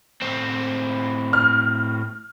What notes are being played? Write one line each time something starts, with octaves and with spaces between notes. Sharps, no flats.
A2 C4
F6